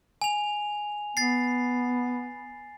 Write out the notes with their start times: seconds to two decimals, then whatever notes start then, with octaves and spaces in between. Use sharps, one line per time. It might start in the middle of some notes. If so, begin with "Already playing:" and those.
0.22 G#5 F7
1.17 B3 A6 C7